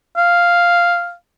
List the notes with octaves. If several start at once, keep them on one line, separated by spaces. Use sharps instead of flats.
F5